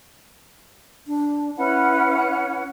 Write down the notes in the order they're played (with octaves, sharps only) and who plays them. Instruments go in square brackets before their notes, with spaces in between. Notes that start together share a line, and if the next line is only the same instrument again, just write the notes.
[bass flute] D4
[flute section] C#4 B4 F#5 [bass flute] E4